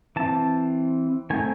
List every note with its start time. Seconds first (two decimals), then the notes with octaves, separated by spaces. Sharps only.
0.16 E3 C4 A5
1.30 D#3 A3 C4 G#5